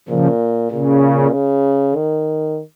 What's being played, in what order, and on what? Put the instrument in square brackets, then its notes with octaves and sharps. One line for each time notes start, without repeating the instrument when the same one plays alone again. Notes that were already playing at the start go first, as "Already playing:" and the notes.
[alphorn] A#2 [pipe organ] C#3 F3
[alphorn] A#2 [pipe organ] C#3
[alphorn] C#3
D#3